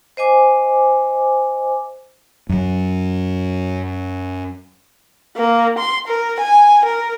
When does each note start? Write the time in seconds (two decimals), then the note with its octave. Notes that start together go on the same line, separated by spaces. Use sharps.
0.17 C5 D#5 G#5 D6
2.49 F#2 F#3
5.36 A#3
5.78 C6
6.07 A#4
6.40 G#5
6.85 A#4